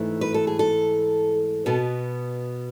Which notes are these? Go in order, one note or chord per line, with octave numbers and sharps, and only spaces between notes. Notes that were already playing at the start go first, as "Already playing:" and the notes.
Already playing: G#2 E3 A3
B4
A4
G#4
A4
B2 B3 A4